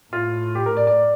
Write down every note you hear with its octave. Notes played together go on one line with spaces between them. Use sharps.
A2 F4
G4
A#4
D5
D5